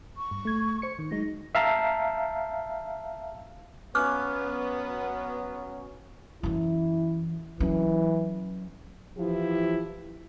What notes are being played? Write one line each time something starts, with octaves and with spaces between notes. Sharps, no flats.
C#6
G2
A3 G#6
C5 C#7
D#3
F#3 G#3 D#4 A#6
E5 F5 A5 A#5
F#3 B3 C#4 F5 D6 F6 F#6
F#2 E3 E4
E3 F#3 C#4
E3 F3 E4 G4